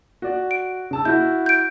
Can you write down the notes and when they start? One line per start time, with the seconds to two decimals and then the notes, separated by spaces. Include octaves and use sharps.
0.22 F#4 D5
0.51 D7
0.91 C#3 A5 E6
1.05 E4 F#4 G6
1.46 G6 D7